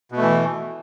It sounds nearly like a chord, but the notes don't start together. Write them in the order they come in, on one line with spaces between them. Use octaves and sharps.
B2 A3 E3